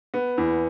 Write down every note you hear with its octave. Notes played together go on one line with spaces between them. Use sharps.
B3
E2